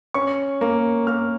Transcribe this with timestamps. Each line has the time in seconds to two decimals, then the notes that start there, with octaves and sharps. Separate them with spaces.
0.14 C#4 C#6
0.61 A#3
1.07 A#3 F6